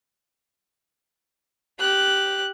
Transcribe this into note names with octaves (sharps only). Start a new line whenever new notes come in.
G4 F#6